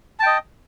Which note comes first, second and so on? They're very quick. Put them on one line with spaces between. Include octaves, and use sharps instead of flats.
A5 G5 D#5